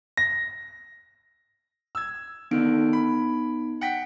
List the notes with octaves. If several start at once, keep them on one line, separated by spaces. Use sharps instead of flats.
A#6
E6 G#6
D3 D#3 B3 D#4 D7
B5
F#5 G5 B6